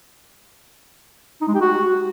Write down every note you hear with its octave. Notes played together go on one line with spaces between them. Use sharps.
D#4
G#3
G4
F#4